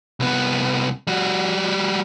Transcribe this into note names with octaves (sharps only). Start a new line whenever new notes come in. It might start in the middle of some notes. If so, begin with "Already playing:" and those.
C2 B3
G3 F#4